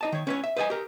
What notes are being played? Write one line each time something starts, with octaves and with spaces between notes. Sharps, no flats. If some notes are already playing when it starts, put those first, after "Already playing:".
D#4 D#5 A5
D#3 C#5
C#4 B4 C#5
E5
B4 C5 D#5 E5 G#5
G4 A#4